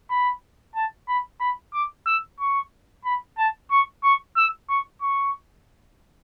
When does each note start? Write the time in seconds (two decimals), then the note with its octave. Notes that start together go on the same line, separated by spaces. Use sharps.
0.10 B5
0.75 A5
1.08 B5
1.40 B5
1.73 D6
2.06 E6
2.40 C#6
3.05 B5
3.38 A5
3.71 C#6
4.04 C#6
4.37 E6
4.69 C#6
5.02 C#6